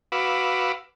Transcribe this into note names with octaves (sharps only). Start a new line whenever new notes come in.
F#4 B4 F5 B5 D6 E6